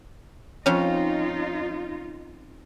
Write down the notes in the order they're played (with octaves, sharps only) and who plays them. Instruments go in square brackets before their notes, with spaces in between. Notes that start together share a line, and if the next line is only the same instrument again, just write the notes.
[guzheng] F2 C#4 [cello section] D#4 F4